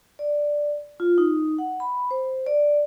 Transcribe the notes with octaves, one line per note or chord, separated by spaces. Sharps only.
D5
F4
D#4
F#5
B5
C5
D5